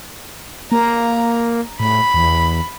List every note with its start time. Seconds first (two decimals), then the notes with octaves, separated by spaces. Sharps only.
0.72 A#3 A#5
1.80 A2 B5
2.14 E2